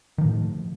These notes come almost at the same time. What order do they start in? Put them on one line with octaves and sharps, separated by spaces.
D#3 F3 A2